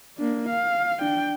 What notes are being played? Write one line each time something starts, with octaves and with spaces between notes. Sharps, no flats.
A#3 D4
F5
D4 G5